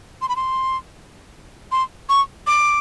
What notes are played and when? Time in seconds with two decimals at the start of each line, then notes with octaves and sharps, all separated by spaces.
0.22 C6
0.29 B5
0.36 C6
1.72 C6
2.09 C#6
2.47 D6